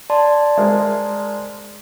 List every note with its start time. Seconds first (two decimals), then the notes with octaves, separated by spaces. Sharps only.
0.10 D5 A5 C6
0.58 G#3 A#4 C5